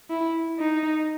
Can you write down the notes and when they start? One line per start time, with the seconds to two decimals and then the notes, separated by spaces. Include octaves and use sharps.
0.10 E4
0.59 D#4